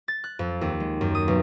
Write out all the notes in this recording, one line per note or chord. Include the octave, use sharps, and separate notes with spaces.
A6
F#6
F2
D#2
G#3
F#2
D#6
B1